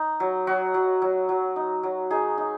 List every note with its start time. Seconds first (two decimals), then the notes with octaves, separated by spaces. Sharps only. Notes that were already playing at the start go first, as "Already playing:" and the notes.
Already playing: D#4
0.20 F#3
0.47 F#3 F#4
0.74 F#3
1.02 F#3
1.29 F#3
1.56 D#4
1.83 F#3
2.11 D#4 G#4
2.38 D#4